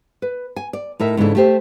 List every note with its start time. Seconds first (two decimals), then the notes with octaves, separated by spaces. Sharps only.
0.22 B4
0.56 G#5
0.73 D5
1.00 A2 D#4 A#4 E5
1.17 G#2 C#3 E3 G#3 D4 A4
1.35 A3 G4 C5